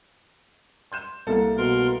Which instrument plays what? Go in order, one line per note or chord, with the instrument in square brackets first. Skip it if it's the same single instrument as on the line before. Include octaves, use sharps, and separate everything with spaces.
[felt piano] C6 G6 E7
[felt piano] C2 A#3 [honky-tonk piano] A4
[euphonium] B2 [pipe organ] A#4 C6